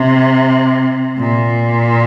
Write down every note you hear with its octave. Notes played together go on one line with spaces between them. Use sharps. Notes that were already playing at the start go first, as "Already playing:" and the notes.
Already playing: C3
A#2